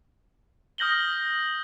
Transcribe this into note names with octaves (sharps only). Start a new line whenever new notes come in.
D#6 F6 G6 A#6 F#7 G7